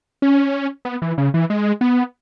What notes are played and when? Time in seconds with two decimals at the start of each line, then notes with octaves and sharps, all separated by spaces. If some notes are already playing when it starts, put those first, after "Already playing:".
0.22 C#4
0.85 B3
1.02 E3
1.18 C#3
1.34 E3
1.50 G#3
1.81 B3